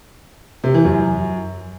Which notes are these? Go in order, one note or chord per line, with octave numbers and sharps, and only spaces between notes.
C3
E3
F#2